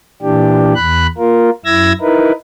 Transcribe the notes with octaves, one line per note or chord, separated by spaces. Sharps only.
A#2 E3 D4 G4
E2 B5 F#6
A#3 F4 A#4
F#2 E4 E6 G#6 A#6
D#4 E4 A#4 B4